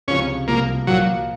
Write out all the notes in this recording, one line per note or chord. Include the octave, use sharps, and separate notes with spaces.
C#2 C3 F3 C#4
C2 C3 F3 A#3
A#2 F3 F#3 A#3